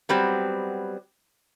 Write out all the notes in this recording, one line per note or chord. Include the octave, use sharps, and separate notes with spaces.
F#3 G3 B3 C4